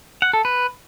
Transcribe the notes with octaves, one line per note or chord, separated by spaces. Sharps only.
F#5
A4
B4